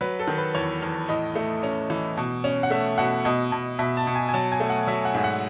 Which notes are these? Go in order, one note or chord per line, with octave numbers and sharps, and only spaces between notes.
F#3 B4
A4
D#3
B4
E2 C#5
E2
A2 D#5
A3
C#4
E3
B2
C#4
F#5
A3 E5
B2 F#5
B2 D#5
B2
B2 E5
A5
B2
G#5
G#5
F#3 A5
G#5
A3
F#5
F#3 E5
F#5
G#2
F#5